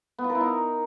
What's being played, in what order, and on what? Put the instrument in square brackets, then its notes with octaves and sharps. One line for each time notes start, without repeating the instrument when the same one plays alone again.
[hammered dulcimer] B3
F4
A#4
E4
D#4